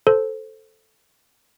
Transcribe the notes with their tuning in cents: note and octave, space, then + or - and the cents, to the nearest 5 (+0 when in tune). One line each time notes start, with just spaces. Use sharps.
A4 +0 C5 +0